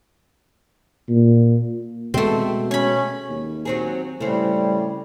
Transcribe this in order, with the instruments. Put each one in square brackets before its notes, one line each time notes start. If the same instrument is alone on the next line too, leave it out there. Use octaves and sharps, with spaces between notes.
[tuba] A#2
[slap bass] B2 G#3 [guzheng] A3 C4
[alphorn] C#4 [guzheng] C#5 B5
[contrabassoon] D#2
[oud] F#3 C4 G#4
[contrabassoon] A2 [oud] C#3 C4 [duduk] G3